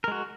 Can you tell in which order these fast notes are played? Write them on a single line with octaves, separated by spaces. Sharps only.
A#4 G#3 F#4